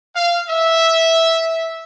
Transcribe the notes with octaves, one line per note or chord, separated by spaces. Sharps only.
F5
E5